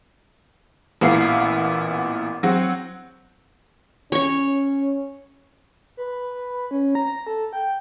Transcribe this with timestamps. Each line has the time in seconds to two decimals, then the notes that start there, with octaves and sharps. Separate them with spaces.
1.01 A1 A#2 B3 E4 F5 C7
2.43 F#3 C4 F#4
4.12 C#4 C#5 C#6
5.97 B4
6.71 C#4
6.95 A#5
7.27 A4
7.53 G5